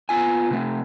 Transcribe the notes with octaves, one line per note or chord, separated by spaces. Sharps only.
B3 F4 G#5
C3 A3